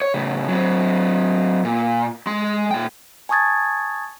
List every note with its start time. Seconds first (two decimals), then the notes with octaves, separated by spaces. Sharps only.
0.02 C#5
0.14 A2 C#3
0.49 F#3 C4
1.65 A#2
2.27 G#3 C6
2.71 A#2 G5
3.29 G#5 A5 C#6 D#6 G#6 A6